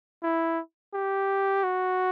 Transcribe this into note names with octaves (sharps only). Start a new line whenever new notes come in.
E4
G4
F#4